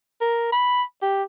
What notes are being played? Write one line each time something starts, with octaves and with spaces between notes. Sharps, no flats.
A#4
B5
G4